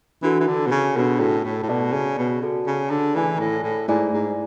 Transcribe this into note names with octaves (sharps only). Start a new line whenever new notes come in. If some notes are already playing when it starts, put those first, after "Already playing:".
E3 D4 F#4 A4
E3
D3
B2
C#3
B2 D4 F#4 A4
A2
A2
A2
B2 F#4 A4 D5 A5
C#3
B2
F#4 A4 D5 A5
C#3
D3
E3 A3 E4 G#4 D5 G#5
A2
A2
G#2 A3 E4 G#4 D5 G#5
G#2